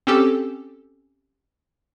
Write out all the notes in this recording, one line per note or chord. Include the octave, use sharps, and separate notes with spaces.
C4 C#4 G4 A4